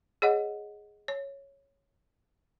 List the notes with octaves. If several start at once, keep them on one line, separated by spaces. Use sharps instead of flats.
G#4 C#5 D#5 F#5
C#5